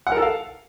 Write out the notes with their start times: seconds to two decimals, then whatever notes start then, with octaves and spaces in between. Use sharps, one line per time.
0.07 F#5
0.12 A#4
0.17 A4
0.22 F5